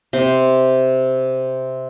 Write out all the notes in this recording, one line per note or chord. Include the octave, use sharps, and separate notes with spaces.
C3 C6